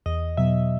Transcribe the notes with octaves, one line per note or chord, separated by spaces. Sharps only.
E2 D#5
B2 F#3 E5